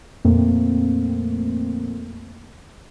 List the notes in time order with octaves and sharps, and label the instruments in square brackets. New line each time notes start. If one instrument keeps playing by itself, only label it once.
[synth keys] F2 A#2 A3 A#3 C4